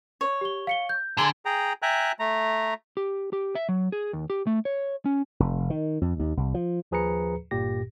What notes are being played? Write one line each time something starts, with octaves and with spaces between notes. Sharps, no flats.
C#5
G4 G7
F5 C#7 G7
G6
D3 G#4 G#5 A#5 C6 G#6 G7
G#4 G5 A#5
E5 G5 G#5 A#5 F#6
A3 A#5
G4
G4
E5
F#3
G#4
D#2
G4
A3
C#5
C#4
F1
D#3
F2
D#2
C2
F3
D#2 F3 G#4 B4 A#5 C#7
G1 G2 A#2 G4 A#6